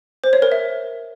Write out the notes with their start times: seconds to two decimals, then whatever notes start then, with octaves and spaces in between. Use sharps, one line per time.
0.24 C5
0.33 C#5
0.42 A#4
0.52 E5